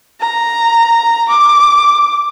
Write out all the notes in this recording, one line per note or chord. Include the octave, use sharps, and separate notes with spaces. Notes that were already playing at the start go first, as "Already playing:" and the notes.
A#5
D6